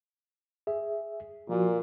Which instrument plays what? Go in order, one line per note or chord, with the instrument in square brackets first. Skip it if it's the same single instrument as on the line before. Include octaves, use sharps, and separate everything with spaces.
[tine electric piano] G#4 E5
[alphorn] A#2 [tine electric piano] F3 F#4